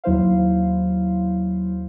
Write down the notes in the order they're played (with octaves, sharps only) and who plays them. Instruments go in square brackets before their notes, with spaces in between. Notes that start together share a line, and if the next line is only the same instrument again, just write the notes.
[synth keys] D#2 F#3 E4 C5 F5